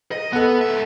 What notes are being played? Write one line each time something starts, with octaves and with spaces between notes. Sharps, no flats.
D#5
B3 A4 F#5
G#2 E5